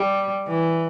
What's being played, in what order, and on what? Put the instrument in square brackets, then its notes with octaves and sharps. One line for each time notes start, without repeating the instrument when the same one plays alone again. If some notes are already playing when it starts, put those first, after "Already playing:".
Already playing: [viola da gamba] G3
E3